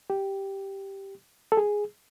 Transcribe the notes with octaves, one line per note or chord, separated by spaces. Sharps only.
G4
A4
G#4